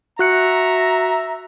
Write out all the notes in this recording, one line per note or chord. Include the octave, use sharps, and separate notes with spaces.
F#4 E5 A#5 F#6 C#7